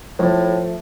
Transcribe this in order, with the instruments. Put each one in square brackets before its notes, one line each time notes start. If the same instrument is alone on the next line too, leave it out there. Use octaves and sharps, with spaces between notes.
[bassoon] A2 [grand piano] F3 A3